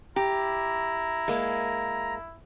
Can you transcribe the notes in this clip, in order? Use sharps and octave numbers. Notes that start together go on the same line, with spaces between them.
E4 G4 A#5
G#3 A#3